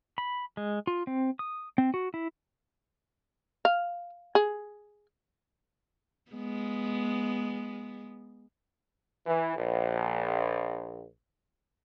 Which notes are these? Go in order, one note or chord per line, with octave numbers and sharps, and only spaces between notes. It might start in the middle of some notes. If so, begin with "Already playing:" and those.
B5
G#3
F4
C4
D#6
C4
F#4
E4
F5
G#4
G#3 B3
E3
A#1